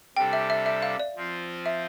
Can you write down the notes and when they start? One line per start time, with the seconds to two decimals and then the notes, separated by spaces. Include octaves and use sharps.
0.17 C3 G3 D4 A4 G5
0.33 E5
0.50 E5
0.66 E5
0.82 F5
1.00 D5
1.16 F3 C4 F4 C5
1.66 E5